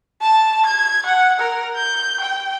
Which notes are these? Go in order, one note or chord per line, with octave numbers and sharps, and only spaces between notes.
A5
G#6
F#5
A#4
G6
G5